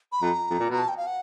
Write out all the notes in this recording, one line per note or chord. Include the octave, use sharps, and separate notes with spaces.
B5
F2 A#5
F2
A#2
B2 A#5
A5
G5
F5
F#5